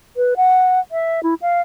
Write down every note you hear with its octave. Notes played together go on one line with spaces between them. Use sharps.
B4
F#5
E5
E4
F5